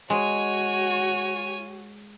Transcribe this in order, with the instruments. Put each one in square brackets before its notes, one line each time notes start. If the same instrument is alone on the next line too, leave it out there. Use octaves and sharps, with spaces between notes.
[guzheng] G#3 [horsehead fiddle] F#4 [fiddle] C#5 G#5